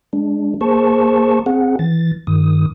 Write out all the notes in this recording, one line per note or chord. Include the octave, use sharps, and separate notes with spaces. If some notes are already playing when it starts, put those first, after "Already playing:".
G#3 D4
A#3 G#4 C5 A5 C#6
C4 G#4 F#5
E3 A6
G2 D#3 D#6